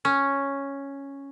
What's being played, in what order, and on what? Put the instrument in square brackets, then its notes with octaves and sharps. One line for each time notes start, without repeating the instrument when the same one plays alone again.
[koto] C#4